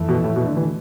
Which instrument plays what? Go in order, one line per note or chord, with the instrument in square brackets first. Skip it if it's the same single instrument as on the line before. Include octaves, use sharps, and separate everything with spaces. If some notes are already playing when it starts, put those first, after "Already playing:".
Already playing: [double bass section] F2 E3 A3
[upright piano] B2
A2
B2
D3
E3